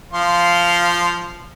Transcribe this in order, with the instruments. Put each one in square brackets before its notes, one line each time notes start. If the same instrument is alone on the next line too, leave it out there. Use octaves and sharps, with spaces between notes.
[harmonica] F3 F5 C6